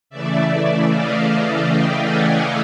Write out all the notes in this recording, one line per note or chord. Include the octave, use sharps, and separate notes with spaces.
C#3 E3 A3 D5 E5
D5 E5
D#5 F5
F5 G5
F#5 G#5